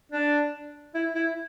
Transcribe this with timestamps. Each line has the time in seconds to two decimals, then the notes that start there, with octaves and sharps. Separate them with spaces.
0.12 D4
0.95 E4
1.15 E4